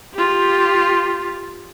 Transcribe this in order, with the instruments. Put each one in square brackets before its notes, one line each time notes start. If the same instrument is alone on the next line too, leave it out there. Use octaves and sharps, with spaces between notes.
[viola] F4 G4